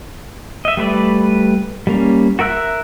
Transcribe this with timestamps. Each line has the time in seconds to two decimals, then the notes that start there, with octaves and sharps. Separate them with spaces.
0.65 D#5 E5
0.77 G3 A3 B4 D5
1.87 G3 A#3 C#4
2.39 F#4 A#4 E5 E6 F#6